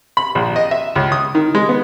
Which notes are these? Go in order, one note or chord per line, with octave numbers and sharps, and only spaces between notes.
B5
A#1
D#5
E5
C#2
D#6
D#3
G#3
B3